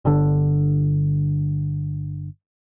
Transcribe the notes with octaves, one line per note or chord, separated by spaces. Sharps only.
G1 D3